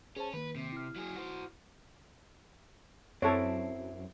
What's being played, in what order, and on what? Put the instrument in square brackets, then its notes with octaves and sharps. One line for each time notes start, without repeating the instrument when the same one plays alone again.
[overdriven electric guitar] C#4 [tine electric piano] G#4 C5 A5
[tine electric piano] D#3 A#3 [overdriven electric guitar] B4
[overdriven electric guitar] C3
[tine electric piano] E4 F6
[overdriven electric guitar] F#3 G#4
F#4 C5
[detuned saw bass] F#2 [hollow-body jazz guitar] C4 E4 [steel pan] A4 C#5